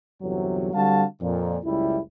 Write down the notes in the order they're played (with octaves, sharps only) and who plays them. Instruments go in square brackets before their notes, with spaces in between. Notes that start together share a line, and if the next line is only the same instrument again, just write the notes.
[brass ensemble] G1 E2 C3 F#3
D3 G3 C4 F#4 F5 A5
F2 A#2
F#1 C#2 G3 E4